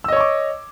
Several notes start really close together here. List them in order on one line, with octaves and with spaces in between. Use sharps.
E6 D#5 C#5 C#6 D6